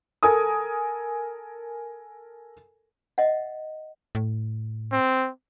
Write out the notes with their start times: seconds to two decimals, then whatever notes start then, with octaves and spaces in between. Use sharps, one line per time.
0.23 A4 A#4 G#5 D#6
3.18 D#5 E5 F#5
4.15 A2
4.92 C4